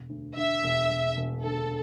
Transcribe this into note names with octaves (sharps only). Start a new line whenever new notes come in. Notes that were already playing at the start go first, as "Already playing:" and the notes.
Already playing: E1
D2
D3 E5
E1
E1
E1
D2 A4